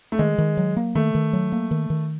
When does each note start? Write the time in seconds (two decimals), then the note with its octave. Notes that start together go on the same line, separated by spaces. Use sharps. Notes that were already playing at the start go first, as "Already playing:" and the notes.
0.12 A3
0.19 D#3 G#3
0.38 D#3
0.57 F#3
0.77 A#3
0.95 D#3 A3
1.15 D#3
1.33 F#3
1.52 A#3
1.71 D#3
1.90 D#3